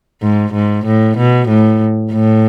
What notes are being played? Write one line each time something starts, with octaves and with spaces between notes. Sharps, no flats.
G#2
G#2
A2
B2
A2
A2